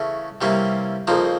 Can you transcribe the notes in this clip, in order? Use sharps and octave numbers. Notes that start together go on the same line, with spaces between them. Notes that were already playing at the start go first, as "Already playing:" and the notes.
Already playing: C#3 E3 A3 C#4
C3 E3 G3 A#3 C#4
F2 C#3 F3 A#3 D#4